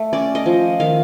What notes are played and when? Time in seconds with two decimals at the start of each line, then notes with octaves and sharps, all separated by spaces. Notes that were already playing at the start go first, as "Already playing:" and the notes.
Already playing: A3
0.13 C#4 D5
0.35 D#5
0.46 F3
0.80 D#3 F5